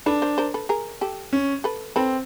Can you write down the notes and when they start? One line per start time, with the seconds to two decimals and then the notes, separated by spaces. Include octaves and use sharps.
0.06 D4 A4 B4
0.22 A#4 C5
0.38 A#4 C5
0.54 A4 B4
0.69 G#4 A#4
1.01 G4 A4
1.33 C#4
1.64 A4 B4
1.96 C4 A4 B4